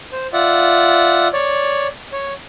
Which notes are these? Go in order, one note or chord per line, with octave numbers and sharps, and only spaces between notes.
C5
F4 D5 E5 F#5
C#5 D5
C#5